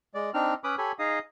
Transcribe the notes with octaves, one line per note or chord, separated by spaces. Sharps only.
G#3 D5
C4 D4 D#4 F6
C#4 B4 B5 D6 D#6
G4 A4 C#5 G#5 B5
D#4 G#4 D#5 F5 D#6